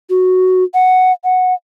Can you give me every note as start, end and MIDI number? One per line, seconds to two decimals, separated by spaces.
0.10 0.63 66
0.74 1.12 78
1.24 1.54 78